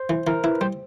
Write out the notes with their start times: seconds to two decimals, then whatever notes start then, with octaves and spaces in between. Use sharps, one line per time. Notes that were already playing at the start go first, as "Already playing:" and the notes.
Already playing: C5
0.09 E3
0.27 E3 A#4
0.44 E4 B4
0.61 G3 C5